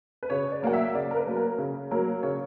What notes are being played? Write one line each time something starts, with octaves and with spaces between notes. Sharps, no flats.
B4
C#3 C#5
D5
F#3 A#3 F#5
E5
C#3 D5
A#4
B4
F#3 A#3
A#4
C#3
F#3 A#3 A#4
C#3 C#5